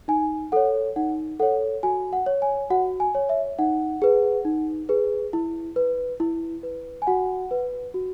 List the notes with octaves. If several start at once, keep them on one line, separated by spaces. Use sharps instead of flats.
D#4 G#5
A4 C#5 F#5
D#4 F#5
A4 C#5 F#5
F#4 G#5
F#5
C#5
G#5
F#4 F#5
G#5
C#5
E5
D#4 F#5
G#4 B4
D#4
G#4 B4
E4
B4
E4
B4
G#5
F#4 F#5
B4
F#4